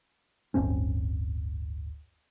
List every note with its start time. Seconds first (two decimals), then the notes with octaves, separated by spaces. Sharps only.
0.54 D1 G1 C4 C#4